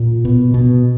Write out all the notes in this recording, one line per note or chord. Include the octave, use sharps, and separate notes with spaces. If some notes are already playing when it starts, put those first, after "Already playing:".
Already playing: A#2
B2
B2